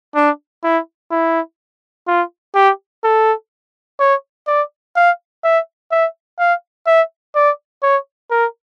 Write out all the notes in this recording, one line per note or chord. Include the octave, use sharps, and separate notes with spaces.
D4
E4
E4
F4
G4
A4
C#5
D5
F5
E5
E5
F5
E5
D5
C#5
A#4